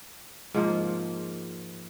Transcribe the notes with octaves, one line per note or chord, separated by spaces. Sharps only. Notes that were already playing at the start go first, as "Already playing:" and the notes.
G#2 F3 A#3